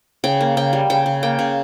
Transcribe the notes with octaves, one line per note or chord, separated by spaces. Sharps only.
C#3 G5
A#3
C#3 G5
G3
C#3 G5
C#3
A#3 G5
C#3